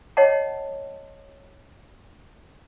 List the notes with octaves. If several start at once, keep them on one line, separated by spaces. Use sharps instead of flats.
C#5 D#5 F#5 A5